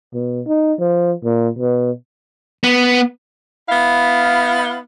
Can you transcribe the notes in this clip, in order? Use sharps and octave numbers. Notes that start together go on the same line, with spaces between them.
B2
D#4
F3
A#2
B2
B3
B3 E4 F5